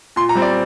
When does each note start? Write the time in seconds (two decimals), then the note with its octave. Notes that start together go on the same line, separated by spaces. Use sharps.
0.16 A#2 C6
0.29 A#5
0.35 G3 C4
0.42 D5